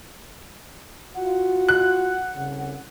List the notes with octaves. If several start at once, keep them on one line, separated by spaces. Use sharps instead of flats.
F4 F#4 F#5
F#6
C2 C#3